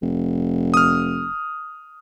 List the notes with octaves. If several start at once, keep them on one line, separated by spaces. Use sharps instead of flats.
F1
D#6 F6